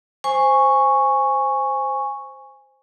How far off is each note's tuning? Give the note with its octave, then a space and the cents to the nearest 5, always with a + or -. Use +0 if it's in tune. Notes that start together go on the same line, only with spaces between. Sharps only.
C5 +0 G#5 -10 C#6 +0